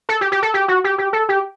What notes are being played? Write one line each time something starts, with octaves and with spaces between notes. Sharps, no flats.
A4
G4
G4
A4
G4
F#4
G4
G4
A4
G4